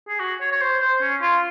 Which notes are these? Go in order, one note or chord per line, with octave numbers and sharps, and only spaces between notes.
G#4
F#4
C#5
C#5
C5
C5
C#4
F4